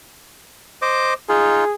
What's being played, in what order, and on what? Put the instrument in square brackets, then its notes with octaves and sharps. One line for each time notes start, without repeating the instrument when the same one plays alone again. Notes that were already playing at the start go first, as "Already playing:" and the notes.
[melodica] C5 D#5 D6
[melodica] D#4 F4 [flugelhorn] G#4